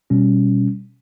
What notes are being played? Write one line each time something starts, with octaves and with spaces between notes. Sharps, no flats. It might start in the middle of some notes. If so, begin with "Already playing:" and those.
B2 G3 C#4